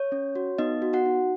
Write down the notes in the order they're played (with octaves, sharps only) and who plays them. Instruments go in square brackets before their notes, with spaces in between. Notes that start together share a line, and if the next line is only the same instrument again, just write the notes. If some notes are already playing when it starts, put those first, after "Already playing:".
Already playing: [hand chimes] C#5
C#4
F#4
B3 D#4 D#5
F#4
F#4 F#5
D#4